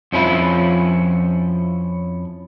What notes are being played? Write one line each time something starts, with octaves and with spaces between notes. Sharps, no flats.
F2 F3 C#4 E4 F4